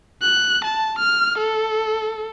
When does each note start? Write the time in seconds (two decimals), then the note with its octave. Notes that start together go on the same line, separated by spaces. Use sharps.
0.22 F#6
0.65 A5
0.99 F6
1.38 A4